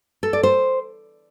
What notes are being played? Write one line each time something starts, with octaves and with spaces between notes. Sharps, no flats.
A4
D5
C5